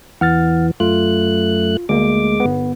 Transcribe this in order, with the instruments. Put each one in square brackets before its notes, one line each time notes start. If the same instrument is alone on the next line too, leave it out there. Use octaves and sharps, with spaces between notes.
[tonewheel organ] E2 E3 [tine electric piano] F#5 F6 A6
[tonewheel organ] F#2 A3 F#6 [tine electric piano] F4
[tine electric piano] D2 A#3 [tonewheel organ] G#3 D6
[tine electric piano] G1 B3